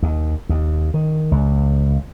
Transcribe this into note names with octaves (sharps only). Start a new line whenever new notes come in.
D#2
D#2
D#3
C#2